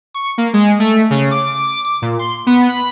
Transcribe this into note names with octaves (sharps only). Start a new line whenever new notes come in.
C#6
A#3
G#3
A3
C#3
D6
D6
A#2
C6
B3
B5